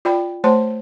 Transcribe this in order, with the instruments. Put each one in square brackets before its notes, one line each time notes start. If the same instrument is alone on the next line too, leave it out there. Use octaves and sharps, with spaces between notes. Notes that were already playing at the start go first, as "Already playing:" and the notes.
[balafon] F4 D5 G5 B5
A3 C5 C#5 A5 C6